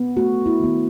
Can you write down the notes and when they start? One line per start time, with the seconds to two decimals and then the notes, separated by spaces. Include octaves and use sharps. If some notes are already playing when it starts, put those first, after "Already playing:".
Already playing: B3
0.17 A3 F#4
0.46 E4
0.60 D#3 B3